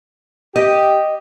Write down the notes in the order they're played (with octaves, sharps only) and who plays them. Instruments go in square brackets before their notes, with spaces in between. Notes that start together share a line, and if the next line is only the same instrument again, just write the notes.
[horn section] G4 [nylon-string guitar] D#5